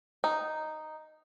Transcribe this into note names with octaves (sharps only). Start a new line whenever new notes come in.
D#4